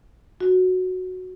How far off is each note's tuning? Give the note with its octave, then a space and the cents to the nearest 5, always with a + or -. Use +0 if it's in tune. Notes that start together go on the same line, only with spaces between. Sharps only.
F#4 -5